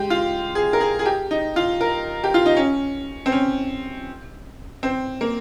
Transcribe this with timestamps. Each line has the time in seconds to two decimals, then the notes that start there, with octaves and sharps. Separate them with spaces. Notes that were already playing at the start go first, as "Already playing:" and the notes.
Already playing: G#3 G4
0.10 F4
0.55 G#4
0.73 A#4
0.80 G#4
0.99 G#4
1.06 G4
1.31 D#4
1.56 F4
1.81 A#4
2.24 G4
2.34 F4
2.46 D#4
2.57 C#4
3.26 C4
3.32 C#4
4.83 C4
5.21 A#3